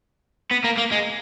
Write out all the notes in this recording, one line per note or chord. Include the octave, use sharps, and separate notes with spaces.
B3
A#3
A#3
G#3